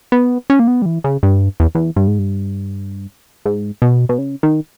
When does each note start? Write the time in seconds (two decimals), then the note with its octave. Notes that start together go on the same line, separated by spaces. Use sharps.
0.12 B3
0.50 C#4
0.59 A#3
0.68 B3
0.82 G3
0.86 E3
1.04 C#3
1.23 G2
1.60 E2
1.75 E2
1.96 G2
2.08 G#2
2.19 G2
3.46 G#2
3.82 B2
4.09 B2
4.18 C#3
4.43 D#3